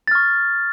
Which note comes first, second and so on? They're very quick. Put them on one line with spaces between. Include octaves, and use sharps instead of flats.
A6 F6 C#6